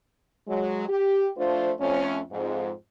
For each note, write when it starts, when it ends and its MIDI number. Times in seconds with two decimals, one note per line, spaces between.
0.48 0.87 54
0.48 0.87 56
0.89 1.29 67
1.37 1.72 53
1.37 1.72 57
1.37 1.72 62
1.37 1.72 65
1.37 1.72 72
1.80 2.22 41
1.80 2.22 57
1.80 2.22 61
2.31 2.71 41
2.31 2.71 44